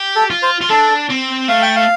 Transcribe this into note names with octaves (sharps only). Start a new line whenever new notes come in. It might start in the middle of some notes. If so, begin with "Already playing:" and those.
Already playing: G4
A4
F4
C5
F4
D4 A4
C4
A3 F5
G5
F5